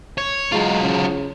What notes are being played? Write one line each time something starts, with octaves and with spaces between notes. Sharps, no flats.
C#5
F#3 G#3 F4
C#3